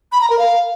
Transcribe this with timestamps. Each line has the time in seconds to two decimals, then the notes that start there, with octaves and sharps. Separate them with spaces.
0.12 B5
0.21 A#5
0.30 A#4
0.39 F5